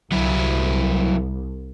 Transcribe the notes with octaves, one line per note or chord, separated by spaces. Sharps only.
C2 F#3 E4